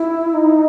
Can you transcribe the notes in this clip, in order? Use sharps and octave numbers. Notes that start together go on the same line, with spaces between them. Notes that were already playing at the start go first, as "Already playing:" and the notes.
Already playing: E4
D#4